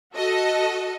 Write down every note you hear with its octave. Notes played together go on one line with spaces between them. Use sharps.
F#4 A4 D#5